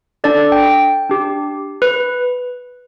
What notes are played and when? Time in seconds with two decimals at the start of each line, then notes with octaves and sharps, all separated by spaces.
0.24 D4 A4 D5
0.52 G5
1.09 D4 G4
1.82 B4